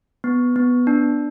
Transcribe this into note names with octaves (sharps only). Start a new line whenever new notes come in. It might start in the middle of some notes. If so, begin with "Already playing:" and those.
B3
B3
D4